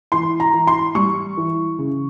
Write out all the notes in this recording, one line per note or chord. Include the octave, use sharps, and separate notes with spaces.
E3 C6
A#5
E3
C6
G3 C#6
E3
C#3